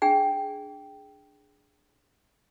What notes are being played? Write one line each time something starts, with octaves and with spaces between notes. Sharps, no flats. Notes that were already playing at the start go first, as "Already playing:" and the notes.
D4 G#4 G5